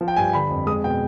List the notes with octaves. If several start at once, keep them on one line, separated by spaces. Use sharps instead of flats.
F3
G5
G2 G#5
D3 B5
F2
G#3 D#6
B2 G5